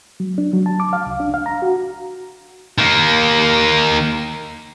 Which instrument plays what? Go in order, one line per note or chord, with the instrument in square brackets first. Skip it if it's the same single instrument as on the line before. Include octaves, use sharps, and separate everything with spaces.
[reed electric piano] F#3
D4
F#3
A5
D6
F5
C2
D4
F5
A#5
F#4
[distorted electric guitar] D#3 A#3